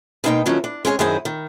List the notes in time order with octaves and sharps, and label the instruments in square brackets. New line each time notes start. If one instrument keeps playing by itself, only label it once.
[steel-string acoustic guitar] B2 G#3 A#3 D#4 E5 G5
D#3 F3 F#3 A3 C#4 E4
D4
G#3 C#4 G#4 C#5
F#2 D#3 D#4 E4 G#4 C5
D#3